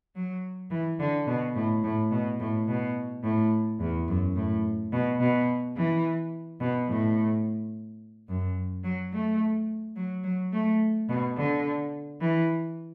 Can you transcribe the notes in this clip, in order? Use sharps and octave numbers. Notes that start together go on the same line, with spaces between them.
F#3
E3
D3
B2
A2
A2
B2
A2
B2
A2
E2
F#2
A2
B2
B2
E3
B2
A2
F#2
F#3
A3
F#3
F#3
A3
B2
D3
E3